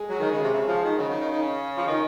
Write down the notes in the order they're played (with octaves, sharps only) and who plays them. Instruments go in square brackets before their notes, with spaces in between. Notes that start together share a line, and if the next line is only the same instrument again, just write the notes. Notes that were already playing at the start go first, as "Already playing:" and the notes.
Already playing: [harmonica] G#3 G#4
[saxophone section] F#3
D#3
C#3
C3
C#3
F3
D#3
[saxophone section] C#3 [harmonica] F#3 F#4
[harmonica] D#3 D#4
D#3 D#4
D#3 D#4
C#4
[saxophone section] F3
D#3